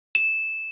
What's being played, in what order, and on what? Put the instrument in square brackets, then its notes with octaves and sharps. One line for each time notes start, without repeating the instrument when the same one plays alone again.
[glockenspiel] E7